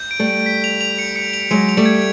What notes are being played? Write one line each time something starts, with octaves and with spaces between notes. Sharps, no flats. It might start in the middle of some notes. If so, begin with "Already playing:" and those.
Already playing: G6
D7
G3 A3
D7
B6
F7
F7
C#7
C#7
F7
F#3 G#3 C#7
F7
G3 A3
G#6